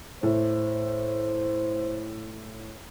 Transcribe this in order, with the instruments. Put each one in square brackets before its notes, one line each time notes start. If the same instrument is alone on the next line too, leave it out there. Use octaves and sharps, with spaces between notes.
[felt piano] A2 [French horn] C5